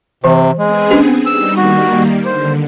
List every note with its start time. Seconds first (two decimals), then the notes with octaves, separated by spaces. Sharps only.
0.24 C3 E3 C5
0.59 G#3 B3 C4 G#4
0.91 C#4 D4 G4
1.26 G3 D#4 E6
1.57 D#3 G3 A#3 F#4
2.25 D3 C5